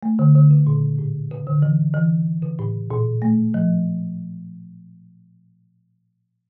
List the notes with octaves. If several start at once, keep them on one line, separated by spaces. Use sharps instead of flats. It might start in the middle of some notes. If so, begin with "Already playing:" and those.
A3
D3
D3
C#3
A#2
A2
C#3
D3
E3
E3
C#3
A2
A#2
A3
F3